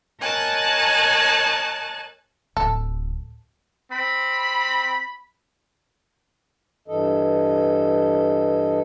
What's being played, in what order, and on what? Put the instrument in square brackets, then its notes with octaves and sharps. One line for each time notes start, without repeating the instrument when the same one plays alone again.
[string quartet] A#4 C#5 D#5 G#5 A5 F#6
[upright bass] D1 [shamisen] A4
[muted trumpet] C4 [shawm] B5
[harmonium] G2 E3 A4 D#5